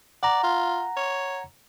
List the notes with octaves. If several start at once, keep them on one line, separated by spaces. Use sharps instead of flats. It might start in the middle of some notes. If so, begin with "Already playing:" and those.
D5 F#5 A#5
F4
C#5